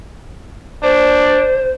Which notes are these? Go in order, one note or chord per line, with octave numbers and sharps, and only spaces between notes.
D4 C5